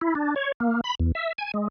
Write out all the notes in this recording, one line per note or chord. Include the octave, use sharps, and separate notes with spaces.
E4
D4
C#5
A#3
B5
E2
E5
G#5
G#3